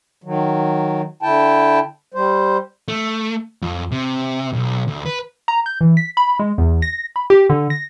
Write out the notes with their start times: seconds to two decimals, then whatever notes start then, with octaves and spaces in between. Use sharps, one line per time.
0.24 D#3 F#3
1.23 D3 E4 G5 A5
2.14 G3 C5
2.88 A3
3.62 F2
3.92 C3
4.53 B1
4.88 D2
5.06 B4
5.48 A#5
5.66 G6
5.81 E3
5.97 B6
6.17 B5
6.39 G#3
6.58 E2
6.82 A#6
7.16 B5
7.30 G4
7.50 D3
7.70 A#6